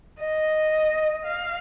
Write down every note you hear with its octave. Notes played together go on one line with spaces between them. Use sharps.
D#5
F5